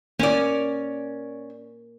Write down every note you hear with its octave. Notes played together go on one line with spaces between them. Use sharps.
A#3 C#4 D5